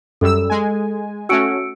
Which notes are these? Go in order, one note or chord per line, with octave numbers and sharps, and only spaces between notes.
F#2 G3 A4 E6
G#3 G#5
A3 C#4 F#4 E6 C#7 D7